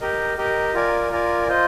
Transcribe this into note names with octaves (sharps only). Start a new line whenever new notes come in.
G4 A#4 D#5
G4 A#4 D#5
F4 A#4 D5 G#5
F4 A#4 D5 G#5
F4 C5 D#5